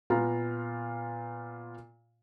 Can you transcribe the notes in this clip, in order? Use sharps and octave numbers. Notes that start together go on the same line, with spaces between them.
A#2 B3 F4 A#5